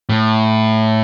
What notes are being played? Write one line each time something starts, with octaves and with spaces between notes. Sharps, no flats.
A2